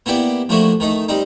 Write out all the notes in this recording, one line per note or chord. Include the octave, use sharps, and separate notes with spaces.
A#3 B3 E4 G4 D5
F3 A3 A#3 D4 E4 F#4
D#3 A3 D#4
G3 C4 D#4